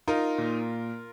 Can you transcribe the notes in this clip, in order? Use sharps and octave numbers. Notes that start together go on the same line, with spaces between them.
D#4 F4 A#4
A#2